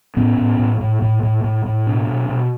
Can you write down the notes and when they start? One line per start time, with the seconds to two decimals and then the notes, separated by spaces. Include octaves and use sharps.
0.16 A2 B3 C#4
0.38 A2
0.59 A2
0.81 A2
1.02 A2
1.23 A2
1.44 A2
1.66 A2
1.87 B2 C4 D4
2.08 B2
2.29 B2